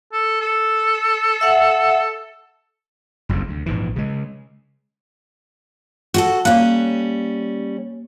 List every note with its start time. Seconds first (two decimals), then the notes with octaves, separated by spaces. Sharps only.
0.13 A4
0.41 A4
1.41 E5 F#5
3.29 F#1 C2 F2 C#3
3.48 D2
3.66 A#1 G#2 E3
3.96 C#3 G#3
6.14 F#4 G4 A4
6.45 G3 A#3 C#4 F5 F#6